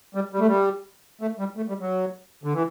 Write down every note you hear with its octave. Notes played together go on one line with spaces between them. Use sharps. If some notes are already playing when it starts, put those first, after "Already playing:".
G3
G3
A3
G3
A3
G3
A3
G3
F#3
D3
E3